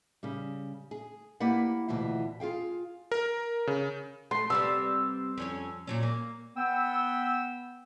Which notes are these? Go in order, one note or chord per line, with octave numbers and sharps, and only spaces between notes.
C#3 G3
G#4
A#3 E4 G4 B4 D5 F#5
D2 B2 E3 E4 F4
F4 G#4 F5 G5
A#4
C#3
A3 C6
C3 G3 B3 E6
F2 C#4 C#5
A#2 F#3 C#4
A#3
B3 G5 E6